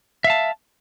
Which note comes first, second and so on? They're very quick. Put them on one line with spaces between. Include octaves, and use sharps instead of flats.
E5 F5 A5